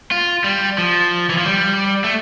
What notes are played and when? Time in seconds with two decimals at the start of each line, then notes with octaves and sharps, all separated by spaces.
0.12 F4
0.44 G3
0.78 F3
1.30 E3
1.38 F3
1.46 G3
2.04 A3